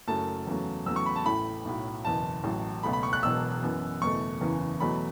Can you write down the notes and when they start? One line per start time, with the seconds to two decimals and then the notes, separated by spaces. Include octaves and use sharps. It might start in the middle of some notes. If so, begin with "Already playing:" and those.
0.07 F#1 F#2 F#3 A3 A5
0.47 E2 C#3 F#3 A3
0.86 E2 C#3 F#3 A3 E6
0.96 C#6
1.06 B5
1.16 A5
1.26 A1 A2 A3 B5
1.65 B1 A2 F#3
2.04 F#1 E2 B2 A5
2.44 A1 A2 F#3
2.83 C#2 B2 F#3 A3 B5
2.93 B5
3.03 C#6
3.13 F#6
3.23 E1 E2 B2 F#3 E6
3.62 F#2 E3 B3
4.01 F#1 E2 B2 A3 C#6
4.41 F#1 E2 C#3 E3
4.80 E2 B2 F#3 A3 B5